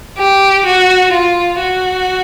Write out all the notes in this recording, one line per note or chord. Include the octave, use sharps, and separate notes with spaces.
G4
F#4
F4
F#4